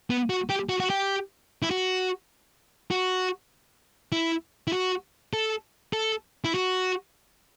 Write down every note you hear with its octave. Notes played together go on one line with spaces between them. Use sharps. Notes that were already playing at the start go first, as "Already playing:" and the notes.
B3
F#4
G4
F#4
F#4
G4
E4
F#4
F#4
E4
E4
F#4
A4
A4
E4
F#4